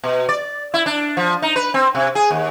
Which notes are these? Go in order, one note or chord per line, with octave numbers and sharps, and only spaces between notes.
B2
D5
E4
D4
F3
D#4
B4
C4
C3
G#4
D#2